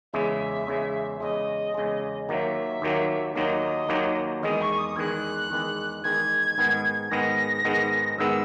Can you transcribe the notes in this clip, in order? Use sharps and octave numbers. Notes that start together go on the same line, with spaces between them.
E2 C#3 G#3 E5
E2 C#3 G#3
E2 C#3 G#3 D#5
E2 C#3 G#3
D#2 D#3 F#3 A#3 E5 F#5
D#2 D#3 F#3 A#3
D#2 D#3 F#3 A#3 D#5
D#2 D#3 F#3 A#3
E2 D#3 G#3 D#5
C#6
D#6
E2 D#3 G#3 F#6 G#6
E2 D#3 G#3
E2 D#3 G#3 G#6
G#2 D#3 G#3 B3
G#2 D#3 G#3 B3 A#6
G#2 D#3 G#3 B3
G#2 D#3 G#3 B3 E6